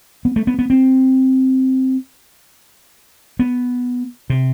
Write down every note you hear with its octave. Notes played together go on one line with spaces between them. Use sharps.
B3
A3
B3
B3
C4
B3
C3